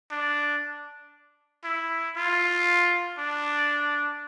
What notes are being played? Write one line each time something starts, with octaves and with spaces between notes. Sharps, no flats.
D4
E4
F4
D4